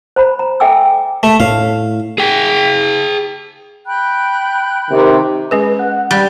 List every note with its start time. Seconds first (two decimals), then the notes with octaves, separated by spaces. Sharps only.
0.16 C5 A#5 B5
0.39 A#5
0.60 A4 E5 G5 G#5 D6 E6
1.23 A3
1.40 A2 F5
2.18 G#4 G5
3.86 G5 B5 F#6
4.91 C3 D#3
5.51 G#3 C#4 G#4 B4
5.79 F#5
6.11 G3